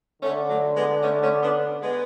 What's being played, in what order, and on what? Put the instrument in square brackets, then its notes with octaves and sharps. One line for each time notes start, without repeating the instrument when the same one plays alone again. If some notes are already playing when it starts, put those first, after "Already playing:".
[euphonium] D3 [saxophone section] A3 C#4
[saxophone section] F#3 A3
G#3 B3
A3 C#4
A3 C#4
B3 D4
G#3 B3